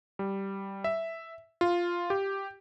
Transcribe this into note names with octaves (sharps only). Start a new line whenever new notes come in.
G3
E5
F4
G4